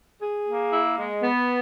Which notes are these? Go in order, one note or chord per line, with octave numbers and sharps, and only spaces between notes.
G#4
A#3
E4
G#3
B3